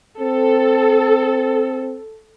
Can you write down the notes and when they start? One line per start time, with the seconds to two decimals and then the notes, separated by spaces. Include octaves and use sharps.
0.20 C4 A4